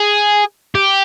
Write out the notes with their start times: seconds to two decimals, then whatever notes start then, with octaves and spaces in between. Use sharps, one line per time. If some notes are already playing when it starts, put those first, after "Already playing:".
Already playing: G#4
0.75 G4